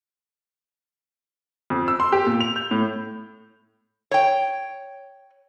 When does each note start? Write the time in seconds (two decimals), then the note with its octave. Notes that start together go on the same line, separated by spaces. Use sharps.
1.70 F2
1.88 E6
2.00 C6
2.12 G4
2.26 A#2
2.41 F7
2.56 G6
2.71 A2
4.11 C#5 G5